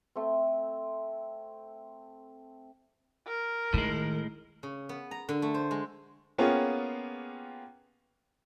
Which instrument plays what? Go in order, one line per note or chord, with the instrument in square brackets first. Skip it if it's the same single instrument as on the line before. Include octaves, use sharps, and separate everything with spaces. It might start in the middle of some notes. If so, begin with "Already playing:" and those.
[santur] A3 C4
[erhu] A#4
[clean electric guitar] A2 G#3 [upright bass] D#3
[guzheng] C#3
B3
A#5
D3
A3
C5
G#3
[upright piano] A#3 B3 C#4 F4 G4 G#4